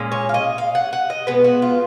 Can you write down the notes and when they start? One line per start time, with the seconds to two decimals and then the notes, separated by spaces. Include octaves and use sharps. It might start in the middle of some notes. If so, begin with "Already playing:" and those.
Already playing: A#2 G#3 C#4
0.12 C#5
0.29 F5
0.34 D#5
0.58 F5
0.75 F#5
0.93 F#5
1.10 D#5
1.27 B2 G#3 B3 B4
1.44 F#4
1.62 F4